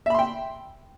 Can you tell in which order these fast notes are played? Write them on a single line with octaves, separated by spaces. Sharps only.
E5 B5 C6 G5